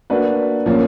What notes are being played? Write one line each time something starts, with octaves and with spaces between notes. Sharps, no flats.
A#3 D4 F#4 B4
A#2 F3 A#3 C#4